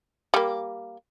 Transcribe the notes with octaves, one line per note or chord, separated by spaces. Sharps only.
G3 A#3